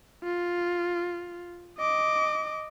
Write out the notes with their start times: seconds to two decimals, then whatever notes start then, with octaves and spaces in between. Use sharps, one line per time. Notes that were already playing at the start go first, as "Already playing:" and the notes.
0.24 F4
1.78 D#5 D6